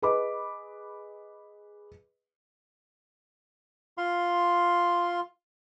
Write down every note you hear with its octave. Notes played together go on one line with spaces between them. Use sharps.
G#4 B4 D#5 B5 D6
F4 F5 C6